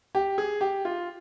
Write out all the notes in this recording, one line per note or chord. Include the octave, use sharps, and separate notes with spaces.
G4
G#4
G4
F4